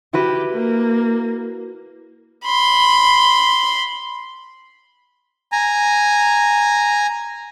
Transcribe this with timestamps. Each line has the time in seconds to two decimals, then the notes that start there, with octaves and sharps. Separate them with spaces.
0.13 E4 F#4 G4 B4
0.53 A#3
2.45 B5 C6
5.52 G#5 A#5